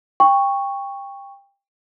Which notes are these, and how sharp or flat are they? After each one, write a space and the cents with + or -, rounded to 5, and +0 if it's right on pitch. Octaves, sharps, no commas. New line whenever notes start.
G5 +25 C#6 +0